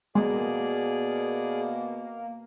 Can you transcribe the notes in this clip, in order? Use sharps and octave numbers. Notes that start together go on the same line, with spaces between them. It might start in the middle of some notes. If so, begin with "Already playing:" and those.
B2 G#3 A#3 G#4 D5